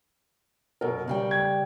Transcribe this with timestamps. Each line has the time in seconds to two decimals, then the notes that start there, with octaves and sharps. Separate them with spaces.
0.81 F#2 B2 A#4
1.07 C#3 G3 G5
1.31 G#6